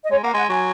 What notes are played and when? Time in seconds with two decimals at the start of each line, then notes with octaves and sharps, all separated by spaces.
0.04 D#5
0.11 G#3 C#5
0.23 A#3 F#5
0.33 G#3 F#5
0.49 F#3 G#5